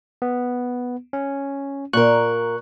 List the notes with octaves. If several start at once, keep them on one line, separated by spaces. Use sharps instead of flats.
B3
C#4
A#2 A#4 C#6 F#6